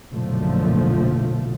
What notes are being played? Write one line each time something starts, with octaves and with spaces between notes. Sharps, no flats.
F#1 B1 A#2 D3 F3 A3